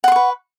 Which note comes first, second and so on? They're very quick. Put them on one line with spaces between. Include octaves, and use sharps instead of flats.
F#5 C6 C#6 B4